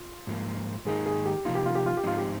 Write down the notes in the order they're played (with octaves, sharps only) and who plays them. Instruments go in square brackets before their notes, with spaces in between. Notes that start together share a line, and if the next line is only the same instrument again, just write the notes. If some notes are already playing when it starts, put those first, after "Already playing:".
Already playing: [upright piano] F4
[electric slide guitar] G#2 F3 A#3
[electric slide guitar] G#2 D#3 A#3 D#4 [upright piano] G#4
[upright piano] G#4
G4
[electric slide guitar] C3 F3 A#3 D#4 [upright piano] F4
[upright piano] G4
F4
G4
F4
G4
[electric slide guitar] G#2 F3 C4 D#4 [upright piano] F4
[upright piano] G4